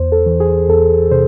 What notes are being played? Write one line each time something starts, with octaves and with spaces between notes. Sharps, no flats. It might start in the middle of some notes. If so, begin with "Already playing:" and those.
Already playing: E2 C5
A4
E3
G#4
E2 A4
C3 C5